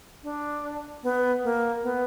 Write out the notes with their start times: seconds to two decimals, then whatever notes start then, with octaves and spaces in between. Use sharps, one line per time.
0.23 D4
1.03 B3
1.44 A#3
1.83 B3